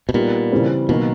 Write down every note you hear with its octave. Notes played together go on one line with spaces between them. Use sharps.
B2
A#2 G3 B3 D#4 G4
C#3 E3 G3 C4
B2 D#3 F#3 A#3